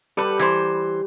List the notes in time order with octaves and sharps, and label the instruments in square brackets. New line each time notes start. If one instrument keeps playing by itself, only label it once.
[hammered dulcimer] G3 [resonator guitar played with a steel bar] A4 B4
[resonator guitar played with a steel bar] E3 C5